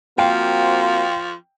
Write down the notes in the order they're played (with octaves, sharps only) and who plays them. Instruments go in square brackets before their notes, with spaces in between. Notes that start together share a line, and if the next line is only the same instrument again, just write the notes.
[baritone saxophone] F3 [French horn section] A#3 C4 F#4 [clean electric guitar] F5 [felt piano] G5